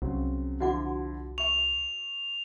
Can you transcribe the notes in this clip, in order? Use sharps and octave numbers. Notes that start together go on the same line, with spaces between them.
C2 C#3 F#3 C4
D3 F3 E4 F#4 F#5 D6
E5 C#6 F7